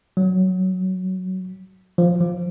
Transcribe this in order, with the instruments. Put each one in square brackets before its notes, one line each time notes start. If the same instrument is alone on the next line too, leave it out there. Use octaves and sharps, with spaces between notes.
[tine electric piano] F#3
F3
F3